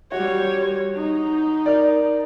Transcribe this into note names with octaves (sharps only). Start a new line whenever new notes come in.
G3 F#4 C#5
D#4
A#4 D5